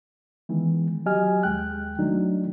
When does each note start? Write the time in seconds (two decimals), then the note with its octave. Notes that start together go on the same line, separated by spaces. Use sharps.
0.49 D#3 E3 G#3 B3
1.06 F#3 G4 D#5 G#5 F6
1.43 D#2 G#3 G5 F#6
1.99 D#3 F#3 A3 D4 D#4